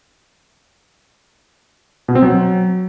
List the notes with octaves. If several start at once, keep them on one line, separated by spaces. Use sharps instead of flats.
B2
C4
F#3